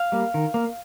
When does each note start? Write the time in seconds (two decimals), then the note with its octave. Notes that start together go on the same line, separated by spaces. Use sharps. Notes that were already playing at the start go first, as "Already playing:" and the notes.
Already playing: F5
0.12 G3 A#3
0.34 D#3
0.54 A#3